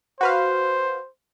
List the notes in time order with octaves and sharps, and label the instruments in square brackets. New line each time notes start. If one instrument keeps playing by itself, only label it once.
[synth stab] F#4 B4 F5 [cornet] C5